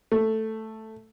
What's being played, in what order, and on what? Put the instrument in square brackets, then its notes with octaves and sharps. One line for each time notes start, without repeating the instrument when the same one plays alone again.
[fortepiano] A3